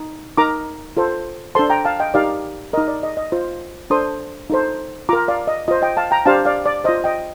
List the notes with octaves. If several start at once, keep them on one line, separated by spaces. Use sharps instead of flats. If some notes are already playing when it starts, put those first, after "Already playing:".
Already playing: D#4
D#4 A#4 A#5 D6
F4 A4 C5
D4 A4 C5 A5 C6
G5 A#5
F5 A5
D#5 G5
D#4 G4 A#4 D5 F5
D#4 A#4 D#5
D5
D#5
D#5
F4 C5
D4 A4 C5 C6 D#6
D#4 A4 C5
F4 A#4 A#5 D6
D5 F5
D#5
F4 C5 D#5
D#5 G5
F5 A5
G5 A#5
D4 G4 C5 F5 A5
D5 F5
D5
F4 C5 D#5
D#5 G5